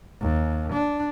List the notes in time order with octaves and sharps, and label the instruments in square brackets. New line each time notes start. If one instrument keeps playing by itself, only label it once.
[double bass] D#2
D4